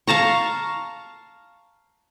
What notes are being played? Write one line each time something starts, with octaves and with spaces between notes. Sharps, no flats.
F5 A5 A#5 C#6